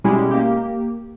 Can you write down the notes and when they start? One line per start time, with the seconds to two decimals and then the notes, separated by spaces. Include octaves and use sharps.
0.04 B2 G3 G#3 C#4 E4 G4
0.31 A#3 G4